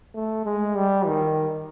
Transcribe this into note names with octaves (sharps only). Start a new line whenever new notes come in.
A3
G#3
G3
D#3